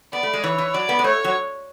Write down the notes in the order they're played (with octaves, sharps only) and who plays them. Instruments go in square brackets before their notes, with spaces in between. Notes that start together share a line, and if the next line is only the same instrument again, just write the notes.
[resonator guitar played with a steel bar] B3 [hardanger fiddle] D5
[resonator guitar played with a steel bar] A3
G#3
[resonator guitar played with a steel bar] E3 [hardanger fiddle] C#5
[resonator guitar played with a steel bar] E3
[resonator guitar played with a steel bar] F#3 [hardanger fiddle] D5
[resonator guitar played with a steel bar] B3
G#3
[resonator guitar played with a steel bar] A3 [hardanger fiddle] C#5
[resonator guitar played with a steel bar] F#3